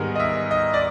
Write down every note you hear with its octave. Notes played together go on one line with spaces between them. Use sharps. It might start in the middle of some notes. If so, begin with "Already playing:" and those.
Already playing: G#2 D#3 G3 B3 G#4 A#4
D#5
E5
D#5
D5